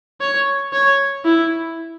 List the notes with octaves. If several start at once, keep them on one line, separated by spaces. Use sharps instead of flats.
C#5
C#5
E4